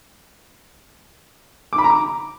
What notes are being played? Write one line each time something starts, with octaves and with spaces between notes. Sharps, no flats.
D6
B5
A#5
D6